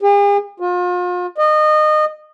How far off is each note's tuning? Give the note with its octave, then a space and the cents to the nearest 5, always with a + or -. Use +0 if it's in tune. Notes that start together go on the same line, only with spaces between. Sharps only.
G#4 -45
F4 +40
D#5 -25